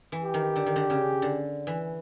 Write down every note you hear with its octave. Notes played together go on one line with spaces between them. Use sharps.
E3
G4
D#3
D3
D#3
D3
C#3
D3
E3